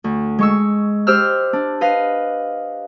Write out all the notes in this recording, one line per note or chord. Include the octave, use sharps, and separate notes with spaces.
D2
G#3 C#6 E6
G4 C5 E6 F6
D4
B4 D#5 F5